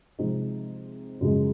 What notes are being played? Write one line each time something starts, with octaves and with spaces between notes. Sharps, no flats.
C3 F3 G#3 C4 D#4
F#2 C#3 F3 G#3